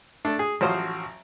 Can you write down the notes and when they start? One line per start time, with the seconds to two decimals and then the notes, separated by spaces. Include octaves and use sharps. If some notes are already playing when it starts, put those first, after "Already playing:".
0.25 A3 D4 A4
0.39 G#4
0.61 A1 F3 F#3 C5 F5 D#6